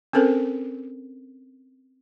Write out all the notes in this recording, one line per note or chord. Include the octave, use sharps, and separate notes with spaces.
C4 C#4 A4 A#4 C5